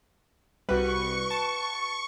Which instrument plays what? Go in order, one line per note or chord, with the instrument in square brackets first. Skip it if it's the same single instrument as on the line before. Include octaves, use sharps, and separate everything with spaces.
[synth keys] C2 G3 [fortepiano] F#4 B4 [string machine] C#6
[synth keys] A5